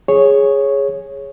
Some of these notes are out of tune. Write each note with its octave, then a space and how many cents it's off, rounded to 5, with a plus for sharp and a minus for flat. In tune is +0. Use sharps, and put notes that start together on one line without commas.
G#4 +0 C#5 -5